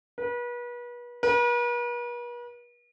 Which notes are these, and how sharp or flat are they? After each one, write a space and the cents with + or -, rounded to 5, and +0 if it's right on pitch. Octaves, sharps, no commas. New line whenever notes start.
B4 -35
B4 -45